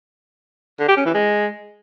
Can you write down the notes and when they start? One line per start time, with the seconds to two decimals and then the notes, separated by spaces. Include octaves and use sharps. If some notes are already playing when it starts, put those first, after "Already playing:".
0.79 D3
0.88 G4
0.97 C#4
1.06 E3
1.14 G#3